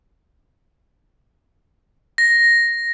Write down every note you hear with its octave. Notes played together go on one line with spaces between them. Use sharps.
A#6